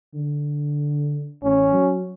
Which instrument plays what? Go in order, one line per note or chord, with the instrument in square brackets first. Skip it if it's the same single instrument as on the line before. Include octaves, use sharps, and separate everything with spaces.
[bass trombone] D3
[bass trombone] A1 [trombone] C#4
[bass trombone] F#3